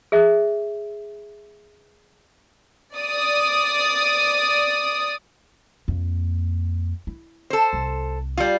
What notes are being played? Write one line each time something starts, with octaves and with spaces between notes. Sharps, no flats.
G#4 E5
D5 D#6
F2 A#3
E4
A4 C5
C2
G3 F4